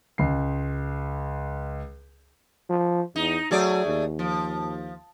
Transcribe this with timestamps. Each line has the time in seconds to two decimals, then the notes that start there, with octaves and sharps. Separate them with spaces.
0.18 C#2 C7
2.69 F3
3.16 E2 D#4
3.51 F#3 A3 G#4 D5
3.86 D#2
4.19 F3